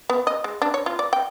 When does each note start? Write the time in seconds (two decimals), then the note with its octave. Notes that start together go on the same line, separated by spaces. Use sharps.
0.10 B3
0.27 D#5
0.44 G#3
0.62 D4
0.74 C#5
0.86 F4
0.99 D5
1.13 G5